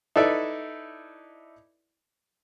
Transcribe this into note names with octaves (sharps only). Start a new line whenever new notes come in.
D#4 E4 A4 B4 D5 E5